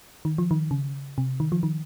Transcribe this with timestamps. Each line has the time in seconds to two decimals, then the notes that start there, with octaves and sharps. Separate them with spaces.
0.25 D#3
0.38 F3
0.51 D#3
0.71 C#3
1.18 C3
1.40 D#3
1.52 F3
1.63 D#3